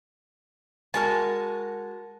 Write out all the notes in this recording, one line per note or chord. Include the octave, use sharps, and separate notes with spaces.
G#3 F#4 A#4 A5